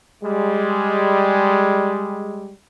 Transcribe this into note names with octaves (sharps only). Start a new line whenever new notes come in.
G3 G#3